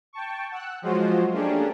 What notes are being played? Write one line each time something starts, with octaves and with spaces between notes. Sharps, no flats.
G5 A5 C#6
F#5 E6 F#6
F3 F#3 G#3 F4 F#4 C5
A3 A#3 C#4 D4 G4 G#4